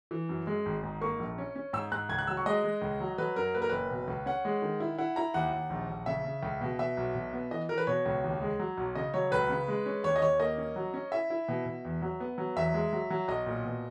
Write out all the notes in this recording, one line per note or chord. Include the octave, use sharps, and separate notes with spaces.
E3
F#2
G#3
G#1
G#2
A#3 C#6
A#1
C#4
C#4
G#2 E6
G#2 F#6
C#2 G#6
F#6
F#3 E6
C#6
G#3 D#5
G#3
C#2
F#3
F#3 B4
F#2 A#4
A#3 B4
A#4
F#1 B4
B2
C#2
C#4 F#5
G#3
D#3
E4
E4 F#5
E4 A#5
D#2 F#5
D#2
A#1
A#1
C#3 E5
C#3
C#2
B2
B2 E5
B1
B2
B3
E3 D#5
E3 A#4
B4
B2 C#5
C#2
D#2
G#3
F#3
B1
C#3 D#5
F#3 C#5
C#2 B4
C#3
G#3
C#4
D#2 C#5
D#5
D#2 C#5
A#3 D#5
C#4
F#3
C#4
E4 E5
E4
B2
B2
E2
F#3
B3
F#3
E2 E5
G#3
F#3
F#3
B1 D#5
A#2
B2